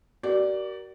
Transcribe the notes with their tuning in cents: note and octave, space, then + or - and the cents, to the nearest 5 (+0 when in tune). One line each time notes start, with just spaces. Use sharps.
F#4 +45 A#4 +15 D5 +0